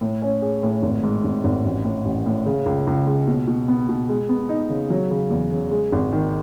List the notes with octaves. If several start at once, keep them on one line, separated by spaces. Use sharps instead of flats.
A2
C#4
G#4
A2
G#1
G#2
G#1
G#1
A1
A2
A1
A2
C#3
C#2
C#2
G#3
B2
B2
B3
B2
G#3
B3
D#4
C#3
F#3
C#3
E2
C#3
G#3
G#1
D#3